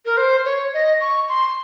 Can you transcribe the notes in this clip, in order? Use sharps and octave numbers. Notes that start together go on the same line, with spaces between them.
A#4
C5
C#5
D#5
C#6
C6